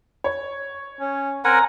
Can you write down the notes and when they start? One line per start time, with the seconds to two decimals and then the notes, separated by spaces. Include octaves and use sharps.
0.24 C#5
1.00 C#4
1.45 C4 A#4 F#5 G#5 A#5